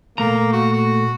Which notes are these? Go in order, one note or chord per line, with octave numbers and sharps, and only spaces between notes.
A#2 A3 A#3 A#5
F#4
F#4